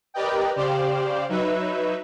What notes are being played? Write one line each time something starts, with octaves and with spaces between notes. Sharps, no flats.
G4 A#4 B4 D5 D#5 G5
C#3 G4 C5 D5 F5
F#3 D#4 B4 E5